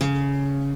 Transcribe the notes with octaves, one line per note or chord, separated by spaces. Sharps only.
C#3